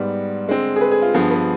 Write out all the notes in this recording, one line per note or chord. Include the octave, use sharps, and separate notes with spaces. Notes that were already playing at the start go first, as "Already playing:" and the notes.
Already playing: G#2 G3 B3
D3 G#3 C4
G#4
B4
G#4
F4
G2 F3 B3 G#4
B4